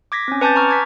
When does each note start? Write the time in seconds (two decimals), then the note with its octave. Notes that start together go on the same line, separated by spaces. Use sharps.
0.12 D6 G#6 A#6 B6
0.28 C4 C#4
0.41 B4 G#5 A5 D6 G6 A6
0.56 A#5 C#6 F6
0.69 D6 G#6 B6